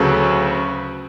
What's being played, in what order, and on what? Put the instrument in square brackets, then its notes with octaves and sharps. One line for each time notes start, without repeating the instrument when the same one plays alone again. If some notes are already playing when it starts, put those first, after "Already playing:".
Already playing: [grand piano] D2 C#3 F#3 A4 B4